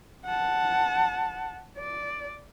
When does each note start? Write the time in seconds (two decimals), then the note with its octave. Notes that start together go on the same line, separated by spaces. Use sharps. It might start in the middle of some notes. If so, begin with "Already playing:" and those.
0.25 F#5 A5
1.78 D5